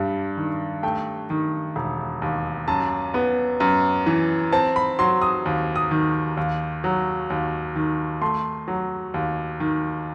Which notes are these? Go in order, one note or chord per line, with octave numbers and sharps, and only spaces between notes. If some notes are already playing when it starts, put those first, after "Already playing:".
Already playing: G2 G3
D#3
A3 G5
D#3
E1
D#2
F#2 A5
B3
F#2
E3
C4 A5
B5
F#3 C6
D#6
D#2
D#6
D#3
D#2
F#3
D#2
D#3
A3 C6
F#3
D#2
D#3